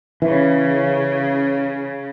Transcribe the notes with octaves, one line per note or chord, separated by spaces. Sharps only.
C#3 E3